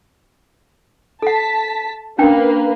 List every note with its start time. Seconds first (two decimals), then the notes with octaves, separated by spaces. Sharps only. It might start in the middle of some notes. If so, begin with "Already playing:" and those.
1.22 A4 F#5 A5 B6
2.18 A#3 C#4 D4 B4 G5